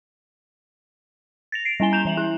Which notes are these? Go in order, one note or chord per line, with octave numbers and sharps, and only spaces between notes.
A6 A#6 F7
C7 D7
G3 C#4 E4 G#5 G7
A#5 G6 E7 F7
E3 E5 F#7
E4 F#6